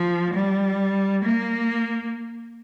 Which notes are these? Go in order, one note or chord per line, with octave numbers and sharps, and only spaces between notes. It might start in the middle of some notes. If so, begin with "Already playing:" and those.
Already playing: F3
G3
A#3